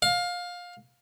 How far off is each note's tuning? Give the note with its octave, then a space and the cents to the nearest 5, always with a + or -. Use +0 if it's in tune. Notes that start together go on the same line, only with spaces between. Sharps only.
F5 +20